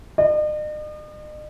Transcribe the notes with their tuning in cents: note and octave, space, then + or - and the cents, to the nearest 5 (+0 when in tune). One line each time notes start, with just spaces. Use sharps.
D#5 -45